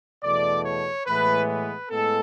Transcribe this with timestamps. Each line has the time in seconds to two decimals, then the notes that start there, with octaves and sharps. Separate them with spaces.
0.24 E2 B2 A3 D5
0.65 C#5
1.07 A2 E3 G#3 B3 B4
1.49 B4
1.90 A2 G#3 B3 A4